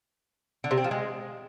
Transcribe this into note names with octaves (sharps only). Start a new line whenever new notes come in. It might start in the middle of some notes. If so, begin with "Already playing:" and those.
D3
C3
C4
F3
G#3